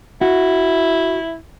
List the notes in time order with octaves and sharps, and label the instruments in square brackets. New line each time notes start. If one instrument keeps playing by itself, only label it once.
[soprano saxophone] E4 [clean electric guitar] F#4